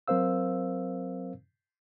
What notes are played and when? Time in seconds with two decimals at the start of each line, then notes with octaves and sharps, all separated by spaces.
0.08 F#3 C4 A#4 C5 F5 E6